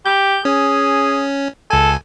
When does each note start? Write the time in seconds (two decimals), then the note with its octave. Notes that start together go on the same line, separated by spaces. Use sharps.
0.06 G4 G6
0.45 C#4 G#4
1.70 C#2 A4 G#5